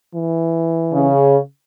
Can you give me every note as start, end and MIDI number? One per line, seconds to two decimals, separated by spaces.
0.15 1.13 52
0.93 1.38 49